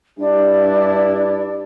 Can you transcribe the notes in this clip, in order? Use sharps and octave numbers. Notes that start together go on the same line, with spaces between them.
G2 D4 E4 G4